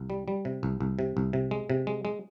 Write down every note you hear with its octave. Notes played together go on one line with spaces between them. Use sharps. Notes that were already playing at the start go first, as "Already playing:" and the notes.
Already playing: C2
G3
G3
C3
C2
C2
C3
C2
C3
G#3
C3
G#3
G#3